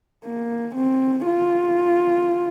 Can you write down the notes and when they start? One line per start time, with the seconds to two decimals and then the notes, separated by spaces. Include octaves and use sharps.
0.25 A#3
0.75 C4
1.27 F4